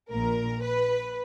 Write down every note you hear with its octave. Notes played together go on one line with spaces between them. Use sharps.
A#1 A#2 A#4
B4